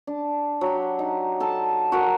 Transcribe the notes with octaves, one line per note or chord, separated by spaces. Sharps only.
D4
F#3 G4
D#4
A4 A5
F#4 A#4